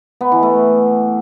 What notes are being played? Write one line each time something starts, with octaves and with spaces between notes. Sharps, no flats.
B3
E3
A3